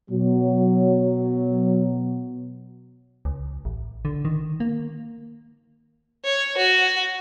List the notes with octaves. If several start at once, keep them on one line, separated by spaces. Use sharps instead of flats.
B2 F#3
C#2
A1
D3
D#3
A#3
C#5
F#4